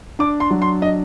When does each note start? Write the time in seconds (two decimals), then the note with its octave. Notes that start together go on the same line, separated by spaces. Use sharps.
0.19 D4 D6
0.40 C6
0.51 F#3
0.62 C6
0.82 D4 D#5